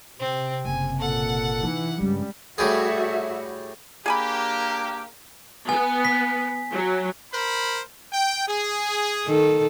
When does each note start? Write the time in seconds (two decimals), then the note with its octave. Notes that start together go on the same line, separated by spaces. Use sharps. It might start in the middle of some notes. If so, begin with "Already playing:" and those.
0.19 C3 C4
0.65 F#1 G#5
1.00 A#2 A4 F#5
1.63 E3 D#4
2.01 G2 C#3 G3 G#3
2.58 A2 G3 F#4 G#4 E5
4.06 A#3 D4 G4 G#4 G#5 B5
5.69 B3 G#5
6.05 B6
6.71 F#3
7.33 A#4 C5 B5
8.11 G5
8.48 G#4
9.27 D#3 A4